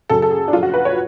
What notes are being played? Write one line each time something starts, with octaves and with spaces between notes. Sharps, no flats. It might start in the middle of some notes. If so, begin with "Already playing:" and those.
F#2 C#3 F#3 A4
A4
G#4
D4
F#2 F3 F4
F#4
B4
C#5